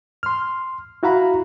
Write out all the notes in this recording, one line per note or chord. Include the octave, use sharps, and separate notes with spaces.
C6 F6
E4 F#4 F5 A#5 B5